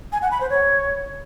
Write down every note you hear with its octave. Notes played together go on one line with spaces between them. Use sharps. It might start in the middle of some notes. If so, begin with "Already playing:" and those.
G#5
F#5
B5
C5
C#5